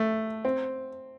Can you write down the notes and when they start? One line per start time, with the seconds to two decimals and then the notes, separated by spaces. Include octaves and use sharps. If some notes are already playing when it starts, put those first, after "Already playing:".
Already playing: A3
0.45 C4